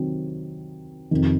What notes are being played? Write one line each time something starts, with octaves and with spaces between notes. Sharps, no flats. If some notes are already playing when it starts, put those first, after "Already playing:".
Already playing: C3 D#3 F#3 C4
F2 C3 D#3